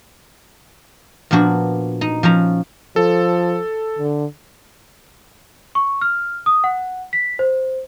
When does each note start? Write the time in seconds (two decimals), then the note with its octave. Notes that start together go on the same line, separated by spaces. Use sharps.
1.31 A#2 F3 B3 D4 F#4
2.01 D#4
2.23 F3 C#4 A#5
2.96 F3 A4
3.99 D3
5.75 C#6
6.02 F6
6.46 D#6
6.64 F#5
7.13 B6
7.39 C5